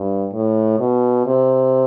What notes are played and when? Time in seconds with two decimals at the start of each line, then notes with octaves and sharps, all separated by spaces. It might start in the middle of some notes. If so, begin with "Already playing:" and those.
Already playing: G2
0.33 A2
0.79 B2
1.26 C3